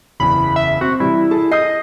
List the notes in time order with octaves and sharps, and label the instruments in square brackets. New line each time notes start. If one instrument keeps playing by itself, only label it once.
[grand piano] F#1 E2 [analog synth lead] B5
[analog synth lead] E5
[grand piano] C4 [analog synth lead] F#4
[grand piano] C3 E3 G3 [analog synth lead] E4
[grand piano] G#4 A4 A5
[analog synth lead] D#5 [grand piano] D#6 G6 C7